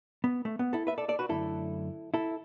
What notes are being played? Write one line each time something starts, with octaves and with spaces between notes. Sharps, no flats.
B3
A3
B3
E4 A4
B4 E5
A4 D5
A4 D5
F#4 B4
F#2 D3 A3 E4 A4
E4 A4